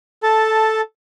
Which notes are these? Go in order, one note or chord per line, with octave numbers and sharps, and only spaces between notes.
A4 A5